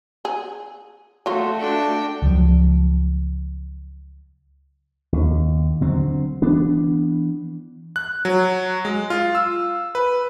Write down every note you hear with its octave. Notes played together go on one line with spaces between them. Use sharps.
G#4
F#3 A3 F4 F#4
D4 G5
C#2 F3 F#3
D#2
D3 F#3 C4
E3 B3 D4
F#6
F#3
G#3
F4
E6
B4